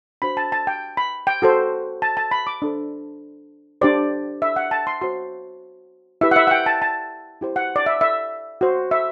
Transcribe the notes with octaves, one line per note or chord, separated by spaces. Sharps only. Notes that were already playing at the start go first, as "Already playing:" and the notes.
D4 F#4 C5 B5
A5
A5
G5
B5
G5
F#4 A4 C5
A5
A5
B5
D6
D4 A4 C5
D4 G4 C5 D5
E5
F#5
A5
C6
F#4 C5 C6
E4 G4 B4 E5
F#5
E5
F#5
G5
A5
A5
E4 G4 C5
F#5
D5
E5
E5
F#4 C5
E5